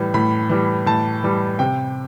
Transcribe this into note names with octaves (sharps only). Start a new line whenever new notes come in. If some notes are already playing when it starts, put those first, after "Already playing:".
Already playing: A2 E3 G3
A2 B5
E3 G3
A2 A5
E3 G3
C3 G5